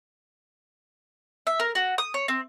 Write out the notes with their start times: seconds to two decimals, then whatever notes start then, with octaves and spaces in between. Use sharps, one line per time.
1.47 E5
1.60 A#4
1.75 F#4
1.98 D#6
2.14 C#5
2.28 C4